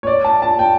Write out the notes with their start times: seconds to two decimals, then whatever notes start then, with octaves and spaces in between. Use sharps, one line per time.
0.03 C#5
0.07 D5
0.24 A5
0.42 A5
0.59 G5